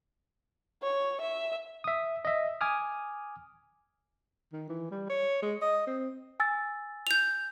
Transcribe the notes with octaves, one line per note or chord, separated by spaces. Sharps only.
C#5
E5
E5 D#6
D#5 E5
G#5 D6 D#6 F6
D#3
E3
G3
C#5
G#3
D#5
C4
G#5 E6 A6
G6 F7